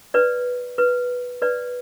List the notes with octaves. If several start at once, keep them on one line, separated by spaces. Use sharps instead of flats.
B4 D5
B4
B4 D5